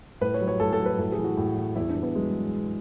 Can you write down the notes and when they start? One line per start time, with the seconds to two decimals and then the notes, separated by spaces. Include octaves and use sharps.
0.21 A2 B4
0.34 C#5
0.41 F#3
0.48 C#5
0.60 A2 A4
0.73 A4
0.80 F#3
0.86 B4
0.98 A2 A4
1.12 G#4
1.19 E3
1.24 F#4
1.37 A2
1.56 E3
1.76 E2 E4
1.90 D4
1.96 E2
2.03 B3
2.15 F#3 G#3